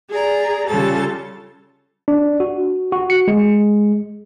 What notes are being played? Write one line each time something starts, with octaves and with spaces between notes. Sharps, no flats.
G#4 D5 A#5
C#3 G3 F4 G4 A4 A6
D4
F#4
F#4
C#7
G#3